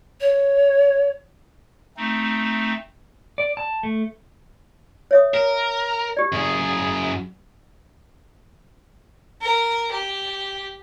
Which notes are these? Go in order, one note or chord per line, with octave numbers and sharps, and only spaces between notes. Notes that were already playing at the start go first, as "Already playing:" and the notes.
C#5
A3 C4 D#4
D5
A5
A3
C#5 E5 D#6
A#4
G4 D5
F#2 G#4
A#4
G4